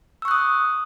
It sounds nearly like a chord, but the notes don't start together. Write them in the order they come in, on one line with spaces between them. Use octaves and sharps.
E6 C#6 F#6 D#6